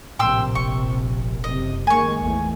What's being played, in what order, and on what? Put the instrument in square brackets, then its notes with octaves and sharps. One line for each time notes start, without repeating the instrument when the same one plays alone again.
[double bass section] A#1 C3 [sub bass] A2 [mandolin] G5 C6 E6
[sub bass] F1 [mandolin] C#6
[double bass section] F#1 C3 [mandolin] D#5
[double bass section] D#3 G#3 A#3 [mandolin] G#5 C#6
[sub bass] A1 [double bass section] E2 A3